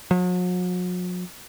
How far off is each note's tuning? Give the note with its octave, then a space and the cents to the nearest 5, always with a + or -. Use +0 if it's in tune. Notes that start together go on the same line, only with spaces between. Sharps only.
F#3 -45